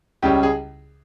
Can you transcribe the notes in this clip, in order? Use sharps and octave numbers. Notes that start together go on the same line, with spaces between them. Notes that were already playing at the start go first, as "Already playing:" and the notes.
C#2 C#3 G3 C#4 G4
G#4